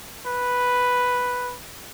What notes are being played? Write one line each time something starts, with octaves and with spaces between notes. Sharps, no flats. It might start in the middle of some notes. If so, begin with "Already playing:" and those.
B4